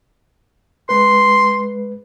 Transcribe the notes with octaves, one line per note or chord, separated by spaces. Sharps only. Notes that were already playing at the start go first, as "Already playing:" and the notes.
G#3 B4 C6